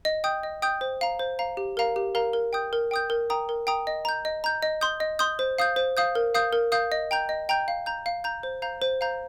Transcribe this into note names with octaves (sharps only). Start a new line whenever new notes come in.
D#5
G5 D#6 G6
D#5
G5 D#6 G6
C5
F5 A#5
C5
F5 A#5
G4
A#4 F5 A#5
G4
A#4 F5 A#5
A#4
G5 D#6 G6
A#4
G5 D#6 G6
A#4
G5 A#5 D#6
A#4
G5 A#5 D#6
D#5
A#5 G6
D#5
A#5 G6
D#5
C6 D#6 G6
D#5
C6 D#6 G6
C5
F5 D#6 G6
C5
F5 D#6 G6
A#4
F5 D#6 G6
A#4
F5 D#6 G6
D#5
G5 A#5 G6
D#5
G5 A#5 G6
F5
A#5 G6
F5
A#5 G6
C5
F5 A#5 G6
C5
F5 A#5 G6